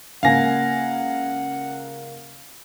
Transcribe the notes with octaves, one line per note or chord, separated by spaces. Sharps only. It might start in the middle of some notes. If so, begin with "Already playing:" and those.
C#2 A#3 F5 F#5 G#5 A#6